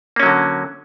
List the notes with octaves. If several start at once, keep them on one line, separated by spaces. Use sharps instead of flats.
D3 F#3 A#3 C#4